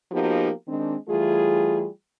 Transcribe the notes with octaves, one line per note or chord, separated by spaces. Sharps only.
F3 A#3 B3 D#4 F#4 G4
D#3 G#3 C4 D4
E3 G3 A3 F4 G#4